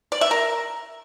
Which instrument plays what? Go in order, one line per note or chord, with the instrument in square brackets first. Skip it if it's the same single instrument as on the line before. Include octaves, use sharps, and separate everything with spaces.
[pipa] D5
E5
A#4